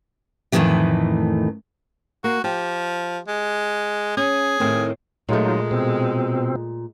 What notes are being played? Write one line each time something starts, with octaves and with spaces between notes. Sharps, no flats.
F2 A2 C3 D#3 E3 A3
A#3 F#4
F3 G4
G#3
C#4 G#4
A2 D#3 C4
A#2 F#3 G#3 A3 D#4 F4
B2 C4